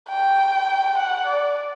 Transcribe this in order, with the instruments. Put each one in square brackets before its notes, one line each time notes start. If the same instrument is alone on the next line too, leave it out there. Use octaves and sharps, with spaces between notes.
[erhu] G5
F#5
D5